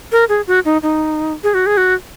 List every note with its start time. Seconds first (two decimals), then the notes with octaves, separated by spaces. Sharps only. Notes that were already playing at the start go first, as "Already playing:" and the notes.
0.12 A#4
0.29 G#4
0.47 F#4
0.65 D#4
0.83 D#4
1.44 G#4
1.54 F#4
1.66 G#4
1.77 F#4